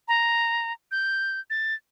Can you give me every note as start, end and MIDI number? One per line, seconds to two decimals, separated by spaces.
0.08 0.73 82
0.92 1.40 91
1.50 1.74 93